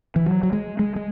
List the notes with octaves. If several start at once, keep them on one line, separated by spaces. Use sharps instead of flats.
E3
F#3
F#3
G#3
G#3
G#3